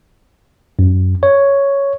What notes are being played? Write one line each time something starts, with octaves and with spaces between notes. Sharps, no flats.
F#2
C#5